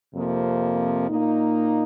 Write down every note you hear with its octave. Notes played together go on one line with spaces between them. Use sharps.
F2 C3 F3 A#3
A#2 A#3 D#4